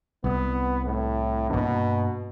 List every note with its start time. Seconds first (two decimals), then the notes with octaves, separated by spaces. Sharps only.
0.24 C2 B3
0.85 A2
1.50 G2 B2 A#3 D4